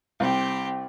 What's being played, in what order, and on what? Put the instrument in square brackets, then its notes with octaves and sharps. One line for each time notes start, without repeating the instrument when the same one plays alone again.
[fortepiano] C2 [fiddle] C4 G4